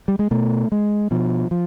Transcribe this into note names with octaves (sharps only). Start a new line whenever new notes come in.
G3
G#3
B2 A3
G#3
B2 F3
F3